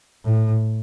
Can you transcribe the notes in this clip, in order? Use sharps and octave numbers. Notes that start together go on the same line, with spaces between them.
A2